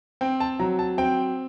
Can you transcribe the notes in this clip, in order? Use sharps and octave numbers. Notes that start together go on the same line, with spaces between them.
C4 G5
A5
F#3 A#5
A5
C4 G5